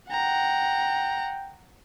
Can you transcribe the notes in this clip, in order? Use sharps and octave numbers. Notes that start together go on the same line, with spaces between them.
F#5 G5 A#5